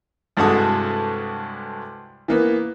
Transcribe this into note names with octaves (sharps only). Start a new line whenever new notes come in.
C2 G2 G#3 F#4 A4 D#6
E3 A#3 B3